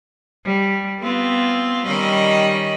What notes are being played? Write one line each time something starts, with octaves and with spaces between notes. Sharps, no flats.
G3
B3 C4 F4
D#3 G3 C#4 D#5 B5